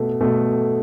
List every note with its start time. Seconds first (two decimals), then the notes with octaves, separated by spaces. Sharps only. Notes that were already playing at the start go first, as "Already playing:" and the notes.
Already playing: B2 A3
0.21 B2 A3